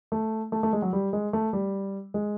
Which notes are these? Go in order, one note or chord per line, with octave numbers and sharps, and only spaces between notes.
A3
A3
A3
G#3
F#3
G3
G#3
A3
G3
G#3